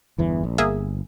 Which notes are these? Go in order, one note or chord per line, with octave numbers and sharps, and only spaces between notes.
G1 E2 E3
A#1
G1 A#3 G#4 E5